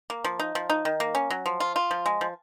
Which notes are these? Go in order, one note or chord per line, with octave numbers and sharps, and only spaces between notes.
A#3
F3
D#4
F3
D#4
D#3
A#3
C#4
F#3
F3
F4
F4
F3
G#3
F3